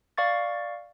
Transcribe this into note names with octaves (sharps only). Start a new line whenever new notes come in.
D5 F5 C#6 A6